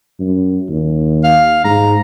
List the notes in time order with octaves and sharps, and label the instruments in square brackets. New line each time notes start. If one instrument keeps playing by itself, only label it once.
[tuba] F#2
D#2
[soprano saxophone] F5
[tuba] G#2 [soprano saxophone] A#5